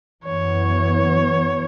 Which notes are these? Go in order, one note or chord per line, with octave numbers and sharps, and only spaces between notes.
F#2 E3 B3 C#5